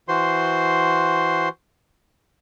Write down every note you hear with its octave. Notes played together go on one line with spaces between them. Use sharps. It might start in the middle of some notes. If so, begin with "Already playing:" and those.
E3 F#4 C5 C6